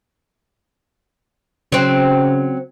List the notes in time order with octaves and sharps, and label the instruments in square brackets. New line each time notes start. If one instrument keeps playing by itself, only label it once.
[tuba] C#3 [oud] F#3 C4